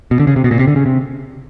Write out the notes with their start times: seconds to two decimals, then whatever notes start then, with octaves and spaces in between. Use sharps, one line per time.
0.11 B2
0.20 D3
0.27 C#3
0.36 C3
0.44 B2
0.51 A#2
0.59 C3
0.68 D3
0.76 C#3
0.86 C3